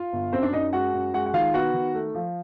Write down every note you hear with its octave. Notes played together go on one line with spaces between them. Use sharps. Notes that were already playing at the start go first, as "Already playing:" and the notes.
Already playing: F4 F5
G1
F#2 C4 C5
D4 D5
F#2 D#4 D#5
G#3 F#4 F#5
F#2
G#3 F#4 F#5
F#5
D#3 F4 F5
B3 F#4 F#5
D#3
A3
F3